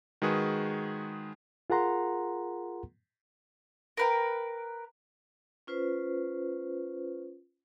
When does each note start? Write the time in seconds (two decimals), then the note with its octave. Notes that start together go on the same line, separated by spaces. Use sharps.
0.22 D#3 G#3 F#4 G#4 B4
1.70 F4 G#4 A#4 F#5 A#5 C6
3.97 A#4 B4 G5
5.67 C#4 F4 B4 C5